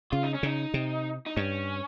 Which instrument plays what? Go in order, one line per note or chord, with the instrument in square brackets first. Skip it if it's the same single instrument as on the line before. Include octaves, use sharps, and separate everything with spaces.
[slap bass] C#3 [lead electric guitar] F4
[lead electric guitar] D#4
C#4
[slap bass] C#3 [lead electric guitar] D#4
[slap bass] C3
[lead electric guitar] D#4
[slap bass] G2 [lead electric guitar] C#4